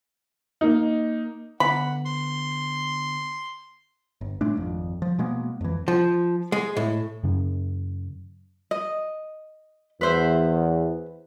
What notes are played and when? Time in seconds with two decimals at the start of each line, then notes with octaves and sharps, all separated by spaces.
0.61 A#3 D#4
1.60 D3 B3 F#5 B5
2.05 C6
4.21 G1
4.41 A2 G#3 A3 D4
4.56 G#1 F2
5.02 F3
5.19 B2 G#3 A#3 B3
5.61 F2 E3
5.88 F3
6.52 G#3
6.76 A2
7.23 F#2 C#3
8.71 D#5
10.01 E2 B4 C5 E5